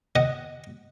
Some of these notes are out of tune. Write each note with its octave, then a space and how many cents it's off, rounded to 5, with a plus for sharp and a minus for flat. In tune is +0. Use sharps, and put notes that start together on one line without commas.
D#5 +0 F#5 +0